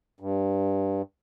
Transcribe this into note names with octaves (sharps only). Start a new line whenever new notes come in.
G2